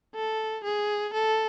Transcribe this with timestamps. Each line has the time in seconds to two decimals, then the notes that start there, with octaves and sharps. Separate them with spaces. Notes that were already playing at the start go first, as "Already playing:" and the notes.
0.15 A4
0.64 G#4
1.14 A4